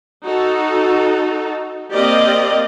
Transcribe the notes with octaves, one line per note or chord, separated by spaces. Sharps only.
D#4 F#4 A4
A#3 C4 G4 A#4 D5 D#5